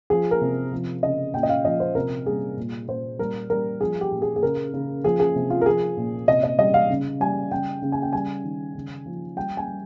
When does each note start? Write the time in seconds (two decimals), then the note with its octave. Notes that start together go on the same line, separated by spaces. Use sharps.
0.10 F3 G#4
0.31 A#4
0.41 C3
0.72 F3
1.03 C#3 D#5
1.34 A#2 G5
1.43 D#5
1.49 F5
1.65 F3 D#5
1.80 C5
1.95 C3 A#4
2.26 G3 G#4
2.57 A#2
2.88 A#2 C5
3.19 G3 A#4
3.50 G3 A#4
3.81 F3 G#4
4.01 G4
4.12 A#2
4.22 G#4
4.36 G#4
4.42 C#3 A#4
4.73 C#3
5.04 F3 G#4
5.20 G#4
5.35 C3
5.50 F4
5.61 A#4
5.66 F3 G#4
5.97 A#2
6.28 C3 D#5
6.43 D#5
6.59 G3 D#5
6.74 F5
6.90 C#3
7.20 G3 G#5
7.51 C#3 G5
7.82 C#3
7.92 G#5
8.02 G5
8.13 G3 G#5
8.44 D#3
8.75 C#3
9.06 F3
9.36 G3 G5
9.57 G#5
9.68 G3